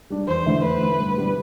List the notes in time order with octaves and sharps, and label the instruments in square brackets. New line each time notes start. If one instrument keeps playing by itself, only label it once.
[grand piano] G3 D4
[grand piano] E2 [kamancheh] C5
[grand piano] D3 A3 E4
[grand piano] E2 [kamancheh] B4
[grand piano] D3 A3 E4
G2
D3 G3 B3